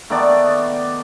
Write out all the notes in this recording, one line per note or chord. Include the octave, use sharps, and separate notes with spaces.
D#3 A3 B3 D5